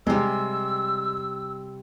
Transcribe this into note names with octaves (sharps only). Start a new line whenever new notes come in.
C3 G3 G#3 E6